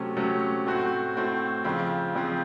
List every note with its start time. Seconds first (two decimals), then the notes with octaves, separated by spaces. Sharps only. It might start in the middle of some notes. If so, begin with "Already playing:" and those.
Already playing: C3 F#3 A3 C#4
0.16 C3 F#3 A3 C#4
0.67 A2 A3 C4 F#4
1.15 A2 A3 C4 F#4
1.65 F2 C#3 F3 C4
2.15 F2 C#3 F3 C4